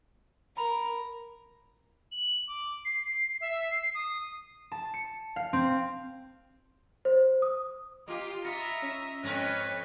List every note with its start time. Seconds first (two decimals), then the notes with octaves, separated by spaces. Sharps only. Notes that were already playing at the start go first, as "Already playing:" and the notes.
0.57 A#4 A#5 B5 F7
2.12 F#7
2.48 D6
2.85 C7
3.41 E5
3.71 C7
3.95 D#6
4.72 A5
4.94 C#7
5.36 F5
5.53 C4
7.05 C5
7.42 D#6
8.08 A#3 F4 G4 D#5
8.45 F4 D#5 E5 A#5 B5 C#7
8.82 C#4 C#6
9.24 F2 G#2 C#4 B4 C#5 D#5 A#6